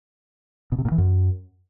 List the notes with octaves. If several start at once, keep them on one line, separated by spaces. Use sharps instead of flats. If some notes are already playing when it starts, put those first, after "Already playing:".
B2
C3
A#2
E3
F#2